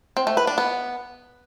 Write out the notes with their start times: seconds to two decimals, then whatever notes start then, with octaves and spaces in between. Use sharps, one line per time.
0.17 C4
0.27 A3
0.37 B4
0.47 D4
0.58 B3